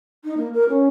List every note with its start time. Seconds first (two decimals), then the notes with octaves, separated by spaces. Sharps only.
0.25 D#4
0.37 A#3
0.53 A#4
0.69 C#4